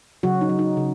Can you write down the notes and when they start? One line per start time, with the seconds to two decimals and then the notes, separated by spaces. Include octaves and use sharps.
0.23 C#3 F#3 F#4
0.41 D#4
0.49 F#3
0.59 D#4
0.77 C#3